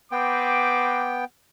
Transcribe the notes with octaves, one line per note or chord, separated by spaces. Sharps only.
B3 C4 B4 G5 D6